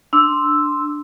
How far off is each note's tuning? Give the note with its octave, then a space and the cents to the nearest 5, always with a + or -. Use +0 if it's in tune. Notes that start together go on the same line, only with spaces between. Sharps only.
D4 +0 C6 +0 E6 +0